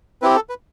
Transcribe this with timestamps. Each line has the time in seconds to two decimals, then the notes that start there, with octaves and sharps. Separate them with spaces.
0.22 C4 E4 G4 B4
0.35 A4
0.49 B4